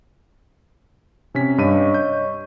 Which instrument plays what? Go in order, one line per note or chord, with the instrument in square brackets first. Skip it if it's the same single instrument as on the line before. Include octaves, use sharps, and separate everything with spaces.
[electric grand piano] C3 C#4 B6
[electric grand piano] G2 G4 D#7 [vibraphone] C#5 D#5 C#6
[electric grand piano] G6